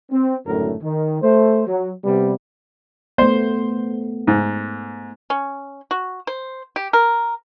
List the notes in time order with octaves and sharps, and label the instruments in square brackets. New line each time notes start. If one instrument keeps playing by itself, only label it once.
[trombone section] C4
G#1 F#2 A2 D3 A3 A#4
D#3
A3 C5
F#3
C3 G3 B3
[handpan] A3 B3 [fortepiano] C5
[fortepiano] G#2
[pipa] C#4
F#4
C5
G4
A#4